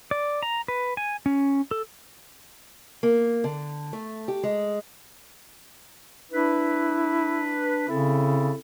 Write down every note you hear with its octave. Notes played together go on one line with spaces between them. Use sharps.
D5
A#5
B4
G#5
C#4
A4
A#3
D3
A3
G4
G#3
D4 E4 B4
C#3 C4 E4 A4